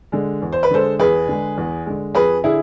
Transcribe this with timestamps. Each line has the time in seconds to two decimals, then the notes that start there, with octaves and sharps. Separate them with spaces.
0.12 D3 G#3
0.42 E2
0.52 C5
0.63 B4
0.71 D3 G#3 A4 C5
0.99 E2 G#4 B4
1.28 D3 G#3
1.57 E2
1.86 D3 G#3
2.15 F2 G#4 B4
2.44 D3 E4 G#4